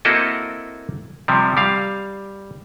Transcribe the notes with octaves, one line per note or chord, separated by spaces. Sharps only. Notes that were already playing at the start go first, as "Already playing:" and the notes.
A#3 C4 E4 F#4 A4 D#5
C3 F3 G3
G3 F5